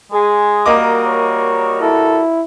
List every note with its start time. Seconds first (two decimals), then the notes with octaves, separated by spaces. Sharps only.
0.12 G#3 G#4
0.66 G3 A#3 F#4 A#4 D#5 D6
1.06 C#5
1.81 E4 A4